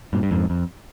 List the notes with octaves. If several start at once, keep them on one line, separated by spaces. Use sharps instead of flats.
G2 A#2
G2
F2 G#2
F2